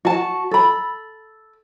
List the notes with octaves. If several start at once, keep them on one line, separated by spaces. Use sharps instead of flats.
F#4 A5
A4 B5